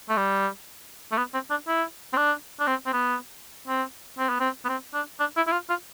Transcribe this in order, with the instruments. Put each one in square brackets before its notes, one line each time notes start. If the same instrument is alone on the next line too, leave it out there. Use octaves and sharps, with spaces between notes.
[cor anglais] A3
G3
A3
B3
C4
D4
E4
C4
D4
D4
C4
C4
B3
C4
C4
B3
C4
B3
C4
D4
D4
E4
E4
F4
F4